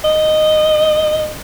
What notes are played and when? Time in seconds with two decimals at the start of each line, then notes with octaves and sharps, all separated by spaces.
0.04 D#5